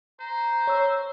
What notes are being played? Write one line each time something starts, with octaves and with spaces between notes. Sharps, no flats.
C5 A#5
C#5 E6